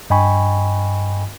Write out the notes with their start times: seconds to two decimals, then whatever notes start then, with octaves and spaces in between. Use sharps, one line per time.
0.10 G2 D#5 G5 G#5 B5 C#6